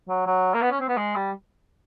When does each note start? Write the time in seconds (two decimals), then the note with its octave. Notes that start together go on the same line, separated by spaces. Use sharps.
0.09 F#3
0.27 F#3
0.54 A#3
0.62 B3
0.71 C#4
0.80 C4
0.88 B3
0.97 G#3
1.16 G3